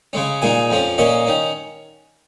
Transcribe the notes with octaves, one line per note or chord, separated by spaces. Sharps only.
C#3 G#3 C#4
A#2 G#3 D#4 G#5
F2 F3 C#4
A#2 A#3 C#4 D#5
D#3 C#4